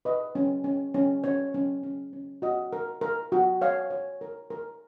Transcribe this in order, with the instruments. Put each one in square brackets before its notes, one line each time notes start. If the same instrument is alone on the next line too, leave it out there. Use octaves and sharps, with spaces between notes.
[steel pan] B4 D#5
C#4
C#4
C#4
C#4 C#5
C#4
C#4
C#4
F#4 D#5
A#4
A#4
F#4
C#5 F5
C#5
A#4
A#4